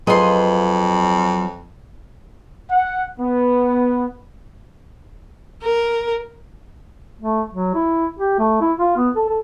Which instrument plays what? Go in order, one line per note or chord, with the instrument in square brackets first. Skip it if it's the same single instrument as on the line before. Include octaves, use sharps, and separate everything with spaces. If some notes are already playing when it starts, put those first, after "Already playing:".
[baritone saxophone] F2 [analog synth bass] F#3 [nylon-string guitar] F4 G#4 B4 [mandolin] D#5 C6
[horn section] F#5
B3
[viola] A#4
[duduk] A3
F#3
E4
G4
A3
E4
F4
B3
A4
A4